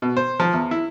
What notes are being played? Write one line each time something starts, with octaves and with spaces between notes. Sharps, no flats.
B2
C5
F3
E2
E4